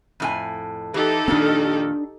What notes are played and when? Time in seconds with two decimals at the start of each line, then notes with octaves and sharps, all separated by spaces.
0.20 F2 A2 G#5
0.94 E3 D#4 G4 A4
1.28 F2 A#2 D#3 C4 D4